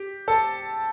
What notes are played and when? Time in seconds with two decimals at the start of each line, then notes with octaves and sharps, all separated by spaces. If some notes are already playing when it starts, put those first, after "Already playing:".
Already playing: G4
0.28 A4 A5